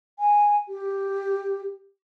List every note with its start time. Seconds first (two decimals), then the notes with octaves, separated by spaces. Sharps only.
0.19 G#5
0.69 G4